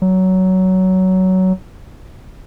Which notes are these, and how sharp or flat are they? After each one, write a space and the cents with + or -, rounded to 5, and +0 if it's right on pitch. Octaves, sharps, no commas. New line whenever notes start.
F#3 +15